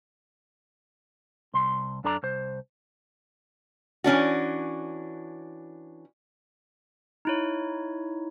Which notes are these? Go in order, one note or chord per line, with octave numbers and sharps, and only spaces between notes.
C2 C6
F#2 D4 A4 D5 A#5
C2 C5
E3 C#4 D4 F#4
D#4 E4 C#5